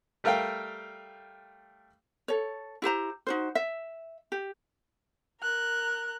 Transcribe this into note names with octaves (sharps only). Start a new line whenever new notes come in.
G3 A3 A#4 F5 G5
A4 C#5
E4 G4 C5 A#5
D#4 F#4 C5
E5
G4
A#4 F#6